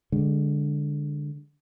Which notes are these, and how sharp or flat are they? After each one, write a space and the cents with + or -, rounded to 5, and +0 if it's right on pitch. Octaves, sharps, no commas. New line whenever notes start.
D3 +0 G#3 -15